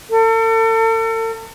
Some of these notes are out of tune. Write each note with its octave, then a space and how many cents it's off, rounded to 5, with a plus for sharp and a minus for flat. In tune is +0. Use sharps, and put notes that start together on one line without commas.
A4 +40